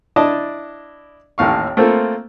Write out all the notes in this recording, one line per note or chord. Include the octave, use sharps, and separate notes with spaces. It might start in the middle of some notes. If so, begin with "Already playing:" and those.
D4 E4 D5 D#5 A5
A1 D#2 A2 F5 C#6
A3 A#3 C4 F4 A4